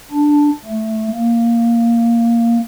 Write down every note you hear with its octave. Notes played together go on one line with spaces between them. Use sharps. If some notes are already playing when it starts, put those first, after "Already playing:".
D4
A3
A#3